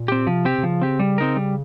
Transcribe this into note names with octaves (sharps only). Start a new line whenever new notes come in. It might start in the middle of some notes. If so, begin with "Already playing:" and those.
Already playing: A#2
C4 G4
C3 F3
C4 G4
C3
C#3 F3
C4 G4
G3
C4 D#4 A#4
G3